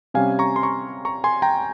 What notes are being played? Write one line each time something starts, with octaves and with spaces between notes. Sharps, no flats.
C3 G3 C#4 F5 G#5
A#5 C#6
C6
A#5 C#6
A#5 C#6
G#5 C6
G5 A#5